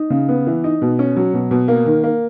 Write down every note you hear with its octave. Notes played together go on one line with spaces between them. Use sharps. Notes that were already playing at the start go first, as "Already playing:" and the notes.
Already playing: D#4
C#3
B3
E3
D#4
B2
C#4
F#3
B2
B2
A#3
D#3
A#3